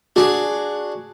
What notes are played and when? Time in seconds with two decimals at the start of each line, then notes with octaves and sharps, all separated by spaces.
0.16 D4 F#4 G#4